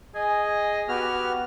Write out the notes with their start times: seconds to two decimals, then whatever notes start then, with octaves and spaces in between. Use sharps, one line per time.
0.15 G#4 D#5 G#5
0.88 B3 F#4 G4 F#5 F6